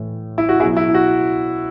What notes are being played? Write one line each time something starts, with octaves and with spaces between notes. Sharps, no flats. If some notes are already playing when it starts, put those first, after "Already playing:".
Already playing: A2 E3
E4
F#4
B2 F#3 E4 G#4
E4
F#4